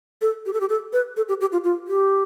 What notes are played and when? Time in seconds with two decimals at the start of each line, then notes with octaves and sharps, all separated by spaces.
0.21 A4
0.46 G4
0.53 A4
0.60 G4
0.69 A4
0.93 B4
1.17 A4
1.28 G4
1.41 G4
1.52 F4
1.64 F4
1.88 G4